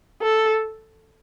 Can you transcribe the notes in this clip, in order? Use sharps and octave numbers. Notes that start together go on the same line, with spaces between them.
A4